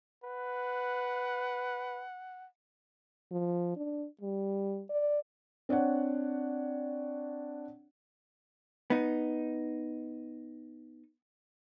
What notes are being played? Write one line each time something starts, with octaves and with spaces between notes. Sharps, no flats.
B4 F#5
F3
D4
G3
D5
C4 D4 C#5 F#5
B3 D#4